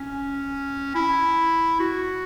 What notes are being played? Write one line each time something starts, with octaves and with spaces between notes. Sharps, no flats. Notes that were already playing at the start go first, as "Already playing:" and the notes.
Already playing: C#4
E4
F#4